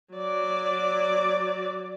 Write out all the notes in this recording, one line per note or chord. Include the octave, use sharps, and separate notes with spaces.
F#3 D5